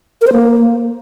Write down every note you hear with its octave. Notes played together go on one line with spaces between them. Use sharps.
A#4
C5
A#3